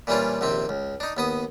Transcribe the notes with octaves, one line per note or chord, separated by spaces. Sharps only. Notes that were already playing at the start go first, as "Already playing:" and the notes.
A#2 E3 G3 C#4 D4 F4
A#1 D#2 C3 C4
C#2
D4 D#4
D#2 B3 D#6